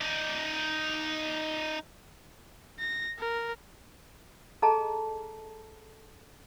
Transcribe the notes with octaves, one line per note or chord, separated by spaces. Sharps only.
D#4 D5
A#6
A#4
G#4 A4 D#5 A5 A#5